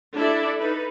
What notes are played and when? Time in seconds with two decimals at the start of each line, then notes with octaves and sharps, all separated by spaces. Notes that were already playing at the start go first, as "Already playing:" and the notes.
0.15 D4 E4 A4 D5 E5
0.58 D#4 A4 B4